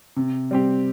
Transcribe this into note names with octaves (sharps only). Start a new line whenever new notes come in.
C3
G3 C4 G4